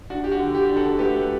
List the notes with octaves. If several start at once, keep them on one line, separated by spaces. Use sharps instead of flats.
D4 F#4
G4
F#4
D3
G4
D4
F#4 A4
A3 G4 B4